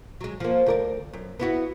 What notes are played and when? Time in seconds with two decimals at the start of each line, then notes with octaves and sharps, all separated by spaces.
0.21 F#3 G#3
0.40 F3 A#3
0.66 D2 A#4 D5
1.13 F#2
1.40 B3 E4 F#4